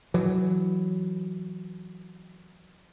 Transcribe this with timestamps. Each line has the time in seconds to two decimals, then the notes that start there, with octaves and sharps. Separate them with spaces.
0.14 E3 F#3